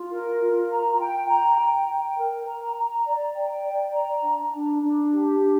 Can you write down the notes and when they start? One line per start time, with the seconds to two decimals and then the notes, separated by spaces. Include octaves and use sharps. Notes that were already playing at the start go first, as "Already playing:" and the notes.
Already playing: F4
0.11 A#4
0.40 F4
0.69 A#5
0.99 G5
1.29 A#5
1.58 G5
1.88 G5
2.17 A#4
2.46 A#5
2.76 A#5
3.06 D5
3.35 G5
3.65 D5
3.95 A#5
4.23 D4
4.54 D4
4.82 D4
5.12 G4
5.42 D4